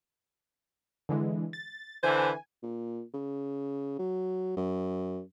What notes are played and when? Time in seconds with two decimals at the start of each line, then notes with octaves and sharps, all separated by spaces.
1.09 D3 E3 G#3
1.53 A6
2.03 D3 E3 C5 G#5
2.63 A#2
3.14 C#3
3.99 F#3
4.57 F#2